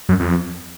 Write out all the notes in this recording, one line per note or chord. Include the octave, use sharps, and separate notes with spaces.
F#2
F2